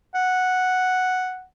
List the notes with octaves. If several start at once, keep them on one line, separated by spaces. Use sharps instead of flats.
F#5